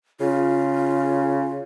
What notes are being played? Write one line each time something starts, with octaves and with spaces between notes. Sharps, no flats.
C#3 F4